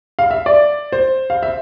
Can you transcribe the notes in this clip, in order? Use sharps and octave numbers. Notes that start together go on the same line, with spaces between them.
F5
E5
D5
C5
F5
E5